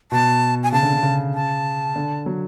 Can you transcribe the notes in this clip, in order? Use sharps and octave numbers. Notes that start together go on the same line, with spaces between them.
B2 A5
G#5
C#3 A5
D3
D3
C#3
A5
D3
F#3